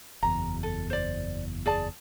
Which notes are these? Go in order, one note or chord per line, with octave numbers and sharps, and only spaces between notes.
F#1 E2 A#5
A4
C5 D5
G#4 D5 A5